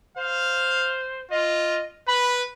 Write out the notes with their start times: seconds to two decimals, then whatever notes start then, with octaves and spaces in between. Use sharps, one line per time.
0.17 C5 F5
1.31 F4 D#5
2.08 B4 B5